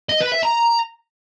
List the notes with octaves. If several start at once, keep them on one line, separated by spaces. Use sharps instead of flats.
D#5
B4
E5
A#5